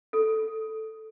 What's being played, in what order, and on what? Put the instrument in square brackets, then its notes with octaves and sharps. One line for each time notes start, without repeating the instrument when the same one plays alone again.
[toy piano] A4